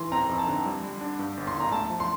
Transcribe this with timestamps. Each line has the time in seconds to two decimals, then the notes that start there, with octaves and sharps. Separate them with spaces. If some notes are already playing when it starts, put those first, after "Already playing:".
Already playing: E3 C6
0.12 C4 A#5
0.29 F2
0.38 A5
0.47 D3
0.65 G3
0.83 G3
1.01 D4
1.19 G2
1.37 G1
1.47 C6
1.54 G1
1.60 A#5
1.72 A3 A5
1.90 F3
2.00 C6